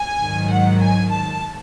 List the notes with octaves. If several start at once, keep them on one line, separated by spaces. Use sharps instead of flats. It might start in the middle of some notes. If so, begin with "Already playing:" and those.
Already playing: G#5
G#2 D#3 F#3
F#5
G#5
A5